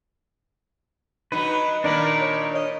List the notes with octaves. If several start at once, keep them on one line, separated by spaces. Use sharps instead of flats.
F#3 D#4 B4
A#2 D#3 A#3 D4 A#4 D5 B5
C#5
D#5